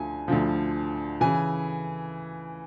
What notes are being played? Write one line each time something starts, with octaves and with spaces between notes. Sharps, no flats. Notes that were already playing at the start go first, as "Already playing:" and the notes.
Already playing: D2 D3 F3 G#5
D2 D3 F3
C#3 E3 G#5